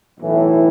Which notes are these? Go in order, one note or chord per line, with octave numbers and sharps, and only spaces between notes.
B1 A2 E3